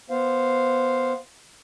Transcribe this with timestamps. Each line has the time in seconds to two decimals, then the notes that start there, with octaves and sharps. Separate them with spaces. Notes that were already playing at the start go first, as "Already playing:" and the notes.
0.10 B3 C5 F5